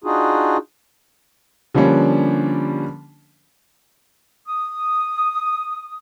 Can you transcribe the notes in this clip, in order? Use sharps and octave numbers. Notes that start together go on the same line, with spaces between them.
D4 D#4 F4 F#4 G#4
D3 F3 G3 A#3 C#4 D4
D#6